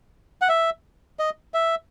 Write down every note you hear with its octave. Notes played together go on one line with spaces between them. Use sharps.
F#5
E5
D#5
E5